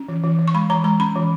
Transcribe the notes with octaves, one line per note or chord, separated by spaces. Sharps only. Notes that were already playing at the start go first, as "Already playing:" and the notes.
Already playing: C#4
E3
E3
E3
C#6
G#3 B5
E3 A#5
G#3 A#5
C#4 B5
E3